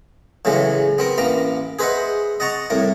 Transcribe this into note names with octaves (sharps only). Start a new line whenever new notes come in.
A2 C#3 E3 F#3 G#3
B3 C4 A#4
A1 A#3 B3 A#5
G#4 B4 C5 D#5 E5 F#5
D#5 F#5 A5 A#5 C#6
C2 A2 A#4